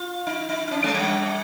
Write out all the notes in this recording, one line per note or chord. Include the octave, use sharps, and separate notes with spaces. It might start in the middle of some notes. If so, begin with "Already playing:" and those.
Already playing: F4
D#4
D#4
D#4
C#4
G#3
G3